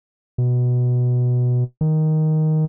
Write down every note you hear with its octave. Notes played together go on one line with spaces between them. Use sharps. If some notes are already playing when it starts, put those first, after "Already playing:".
B2
D#3